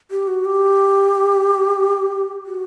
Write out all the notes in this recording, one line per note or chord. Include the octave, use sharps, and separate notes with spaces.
G4
F#4
G4
F#4